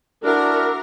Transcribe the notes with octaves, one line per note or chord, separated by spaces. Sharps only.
D4 E4 F#4 A#4 F6